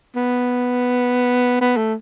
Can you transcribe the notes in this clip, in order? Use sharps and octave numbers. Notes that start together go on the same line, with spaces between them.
B3
B3
A3